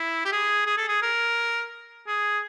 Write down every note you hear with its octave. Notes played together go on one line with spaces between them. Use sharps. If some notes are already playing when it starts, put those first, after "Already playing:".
Already playing: E4
G4
G#4
G#4
A4
G#4
A#4
G#4